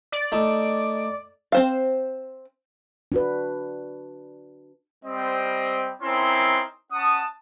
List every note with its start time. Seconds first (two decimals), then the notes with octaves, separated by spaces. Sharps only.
0.12 D5
0.32 A3 D#4
1.52 C4 C5 F5
3.12 D4 F#4 B4
5.04 G3 C4 D#5
6.02 C4 C#4 D#4 E4 A#4 C6
6.92 C#4 F#5 A5 D#6